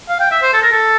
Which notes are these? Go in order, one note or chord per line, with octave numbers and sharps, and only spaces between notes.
F5
G5
E5
C5
A4
A#4
A4